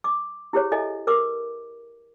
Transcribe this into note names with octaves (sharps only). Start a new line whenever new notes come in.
D6
E4 G4 G#4 C5 C#5
E4 A4 D#5 E5 G#5
A#4 B4 D6